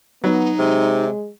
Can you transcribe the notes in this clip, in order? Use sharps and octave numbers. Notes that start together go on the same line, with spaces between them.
F#3 B3 D#4
C3 G#3